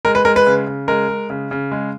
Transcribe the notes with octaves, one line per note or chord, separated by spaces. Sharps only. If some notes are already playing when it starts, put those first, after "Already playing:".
G#3 A#4
B4
G#3 A#4
B4
C#3
C#3
G#3 A#4
G#3
C#3
C#3
G#3